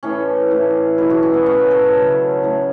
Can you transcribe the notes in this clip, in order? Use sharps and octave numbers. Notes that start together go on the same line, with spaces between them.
A2 E3 A3 C#4
A2 E3 A3
B2 F#3 A3 E4
F#4
C#4
B3
B2 F#3 A3 C#4
A4
C#3 F#3 A3
A2 A3